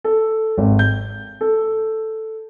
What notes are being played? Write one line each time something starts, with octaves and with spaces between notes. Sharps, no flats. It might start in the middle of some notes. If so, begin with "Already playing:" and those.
A4
G#1
G6
A4